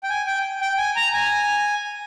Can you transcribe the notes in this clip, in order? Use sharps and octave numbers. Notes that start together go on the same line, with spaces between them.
G5
G#5
G5
G5
G#5
A#5
G#5